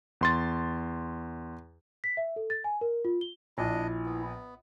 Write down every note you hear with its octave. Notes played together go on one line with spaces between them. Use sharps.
E2 C6 A6
B6
E5
A4
A6
G#5
A#4
F4
G7
A#1 D4 E4 D#5
B3